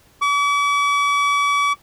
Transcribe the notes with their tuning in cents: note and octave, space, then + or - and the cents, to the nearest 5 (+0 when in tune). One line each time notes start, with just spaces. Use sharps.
D6 -45